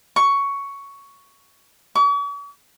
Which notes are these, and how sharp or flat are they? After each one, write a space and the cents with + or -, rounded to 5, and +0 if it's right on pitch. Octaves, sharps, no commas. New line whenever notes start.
C#6 +10
C#6 +45